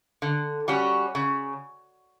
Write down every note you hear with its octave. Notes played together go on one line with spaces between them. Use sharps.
D3
G3 C#4 F#4
C#3